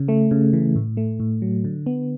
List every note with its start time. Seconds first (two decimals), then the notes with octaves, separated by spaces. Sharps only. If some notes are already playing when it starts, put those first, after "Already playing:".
Already playing: C#3
0.08 A3
0.31 C#3
0.53 E3
0.76 A2
0.97 A3
1.20 A2
1.42 F#3
1.64 D3
1.86 B3